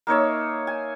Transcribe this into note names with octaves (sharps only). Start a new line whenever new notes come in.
A#3 D#4 C#5 E5
G#5